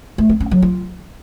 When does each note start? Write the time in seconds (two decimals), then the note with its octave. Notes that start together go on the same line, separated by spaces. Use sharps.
0.18 A3
0.29 C4
0.40 C#4
0.51 F#3
0.62 F4